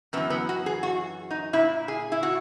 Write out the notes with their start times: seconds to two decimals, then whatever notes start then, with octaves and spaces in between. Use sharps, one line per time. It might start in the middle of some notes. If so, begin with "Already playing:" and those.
0.13 F#2 B3
0.17 E3
0.30 B3
0.49 F#4
0.66 G#4
0.83 F#4
1.31 D#4
1.53 A#2 E4
1.88 G#4
2.12 E4
2.23 F#4